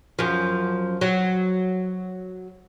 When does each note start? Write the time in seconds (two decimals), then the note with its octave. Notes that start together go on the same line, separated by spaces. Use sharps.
0.19 F#2 F3
1.01 F#3